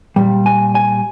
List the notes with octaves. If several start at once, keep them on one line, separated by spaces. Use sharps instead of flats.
A#2 G3
G#5
G#5